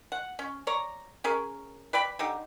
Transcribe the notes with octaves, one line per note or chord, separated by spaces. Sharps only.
F#5
C#4
C#5 D5 A#5
C#4 G#4 A#4
B4 D5 G5 B5
D3 D#4 G4